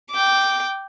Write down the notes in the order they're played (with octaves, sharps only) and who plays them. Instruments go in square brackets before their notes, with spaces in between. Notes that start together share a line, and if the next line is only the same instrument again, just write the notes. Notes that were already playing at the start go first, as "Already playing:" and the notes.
[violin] G5 D6